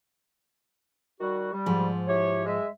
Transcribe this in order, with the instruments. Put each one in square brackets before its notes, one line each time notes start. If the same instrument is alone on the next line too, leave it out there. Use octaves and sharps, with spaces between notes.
[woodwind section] D#3 G3 F#4
G3
[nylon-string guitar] G#2 F3
[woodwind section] E4 G4 C#5
G#3 E5